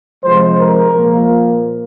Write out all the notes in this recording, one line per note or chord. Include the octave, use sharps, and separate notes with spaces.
C3 F3 G#3 C5
A#4
A#2 F3 A#3